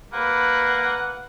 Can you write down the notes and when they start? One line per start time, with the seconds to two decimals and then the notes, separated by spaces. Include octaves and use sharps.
0.13 A#3 B4 F#5